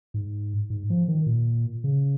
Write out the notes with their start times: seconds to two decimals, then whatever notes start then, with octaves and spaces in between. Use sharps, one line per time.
0.14 G#2
0.70 G#2
0.90 F3
1.08 D#3
1.26 A#2
1.84 C#3